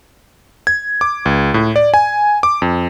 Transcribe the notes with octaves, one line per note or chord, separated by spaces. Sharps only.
G#6
D6
C#2
A2
D5
G#5
D6
F2